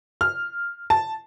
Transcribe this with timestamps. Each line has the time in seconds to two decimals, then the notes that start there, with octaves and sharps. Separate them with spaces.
0.21 F6
0.90 A5